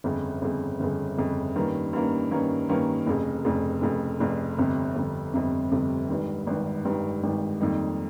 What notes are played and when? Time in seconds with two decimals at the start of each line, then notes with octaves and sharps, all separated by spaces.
0.04 G1 F2 C#3
0.42 G1 F2 C#3
0.80 G1 F2 C#3
1.18 G1 F2 C#3
1.56 G2 D#3 A#3 C#4
1.93 G2 D#3 A#3 C#4
2.31 G2 D#3 A#3 C#4
2.69 G2 D#3 A#3 C#4
3.06 F1 F2 C#3
3.45 F1 F2 C#3
3.82 F1 F2 C#3
4.20 F1 F2 C#3
4.58 G1 F2 C3
4.96 G1 F2 C3
5.33 G1 F2 C3
5.72 G1 F2 C3
6.09 G#1 G2 D#3
6.47 G#1 G2 D#3
6.85 G#1 G2 D#3
7.23 G#1 G2 D#3
7.60 F2 D#3 G3 A#3 D#4